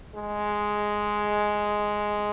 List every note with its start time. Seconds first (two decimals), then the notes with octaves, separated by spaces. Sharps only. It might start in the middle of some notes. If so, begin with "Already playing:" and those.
0.16 G#3